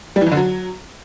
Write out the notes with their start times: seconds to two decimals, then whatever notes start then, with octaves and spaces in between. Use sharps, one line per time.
0.16 G3
0.21 E3
0.26 F2
0.32 D3
0.37 F#3